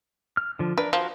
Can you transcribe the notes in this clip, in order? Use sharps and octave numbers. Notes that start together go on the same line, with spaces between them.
F6
D3 F3
D4 A#4 B4
F3 F#4 A#4